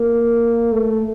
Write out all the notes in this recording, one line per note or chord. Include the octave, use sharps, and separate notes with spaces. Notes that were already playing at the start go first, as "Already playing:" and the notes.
Already playing: A#3
A3